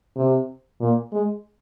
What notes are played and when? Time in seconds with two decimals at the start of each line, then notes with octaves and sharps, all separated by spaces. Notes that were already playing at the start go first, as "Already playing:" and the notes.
0.16 C3
0.81 A#2
1.13 G#3